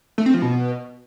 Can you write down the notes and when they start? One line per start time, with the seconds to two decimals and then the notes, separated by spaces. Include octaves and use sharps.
0.18 A3
0.26 C4
0.34 F3
0.42 B2